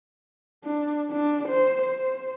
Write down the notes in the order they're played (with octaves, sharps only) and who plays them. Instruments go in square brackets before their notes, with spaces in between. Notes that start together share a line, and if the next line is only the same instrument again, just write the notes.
[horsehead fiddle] D4
D4
C5
C5